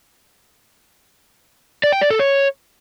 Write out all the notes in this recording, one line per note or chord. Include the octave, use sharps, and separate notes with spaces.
D5
G5
D5
A4
C#5